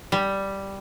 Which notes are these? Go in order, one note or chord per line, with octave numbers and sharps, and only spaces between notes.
G3